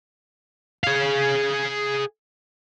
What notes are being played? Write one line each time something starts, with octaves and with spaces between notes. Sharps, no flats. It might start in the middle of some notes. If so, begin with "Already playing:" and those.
G#4 F5